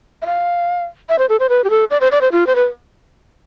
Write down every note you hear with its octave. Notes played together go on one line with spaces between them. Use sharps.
E5
F5
E5
C5
A4
C5
B4
G4
A4
D5
C5
D5
C5
F4
C5
B4